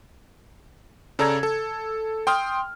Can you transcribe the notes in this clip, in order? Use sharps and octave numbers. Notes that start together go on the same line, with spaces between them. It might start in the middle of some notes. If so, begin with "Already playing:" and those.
C#3 A4 D5 A#5 E6 G#6
A4
G5 C6 D#6 F6